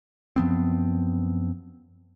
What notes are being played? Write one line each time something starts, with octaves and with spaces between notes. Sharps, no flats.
F#2 F3 B3 C4